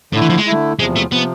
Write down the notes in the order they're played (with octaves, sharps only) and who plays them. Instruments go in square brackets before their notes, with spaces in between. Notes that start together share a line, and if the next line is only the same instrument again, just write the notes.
[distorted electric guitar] A2 [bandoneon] D3 A3 E4
[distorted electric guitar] E3
F3
G#3
[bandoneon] D3 A3 E4
[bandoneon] E2 C3 F3 [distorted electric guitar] G#3
[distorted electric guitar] A3
[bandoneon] C3 F3 [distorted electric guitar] B3